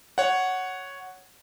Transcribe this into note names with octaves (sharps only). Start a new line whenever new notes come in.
C#5 F#5